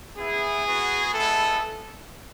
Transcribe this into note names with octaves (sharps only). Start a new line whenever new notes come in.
B3 E4 G#4
B3 F#4
G#3 B3 E4 A4